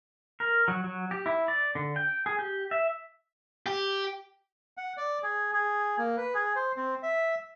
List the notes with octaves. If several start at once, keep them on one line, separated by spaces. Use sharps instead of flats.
A#4
F#3
F#3
G4
E4
D5
D3
G5
G#4
G4
E5
G4
F#5
D5
G#4
G#4
A#3
B4
G#4
C5
C4
E5